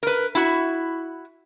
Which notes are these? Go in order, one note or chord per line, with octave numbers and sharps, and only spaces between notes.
A#4 B4
E4 F#4